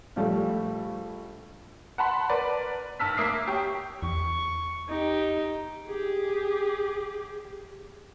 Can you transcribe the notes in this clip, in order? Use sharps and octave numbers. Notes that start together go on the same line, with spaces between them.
A#1 G3 A3
F#5 A5 B5 C6
A#4 B4 D5
F#1 A5 E6 F6 B6
A#3 E5 D6 D#6 C7
G4 C#5 G5
E2 C#6
D#4 G4
G4 G#4